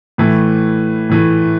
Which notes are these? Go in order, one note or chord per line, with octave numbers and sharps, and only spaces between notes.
A2 E3 A3
A2 E3 A3